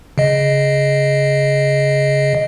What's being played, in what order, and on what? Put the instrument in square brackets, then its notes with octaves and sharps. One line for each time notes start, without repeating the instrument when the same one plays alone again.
[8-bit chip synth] C#3 D#5